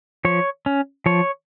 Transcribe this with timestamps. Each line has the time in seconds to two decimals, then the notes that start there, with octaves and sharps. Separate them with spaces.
0.25 F3 C#5
0.66 C#4
1.06 F3 C#5